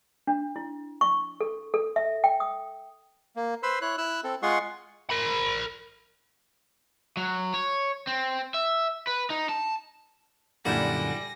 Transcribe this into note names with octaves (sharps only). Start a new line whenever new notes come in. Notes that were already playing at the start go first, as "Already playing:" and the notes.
D4
E4
C#6
A4
A4
E5
G5
D#6
A#3
B4 C5 B5 C6 E6
E4 C#5 F#6
E4 E6 F#6
C4 A4
G#3 F4 G#4 F#5 C6 C#6
A#4 B5
F#3
C#5
C4
E5
B4
D#4
A5
F#2 A#2 D3 G3 E4 F#4 G#5 A#6